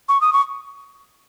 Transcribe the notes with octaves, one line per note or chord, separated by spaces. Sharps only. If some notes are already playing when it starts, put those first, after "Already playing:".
C#6
D#6
C#6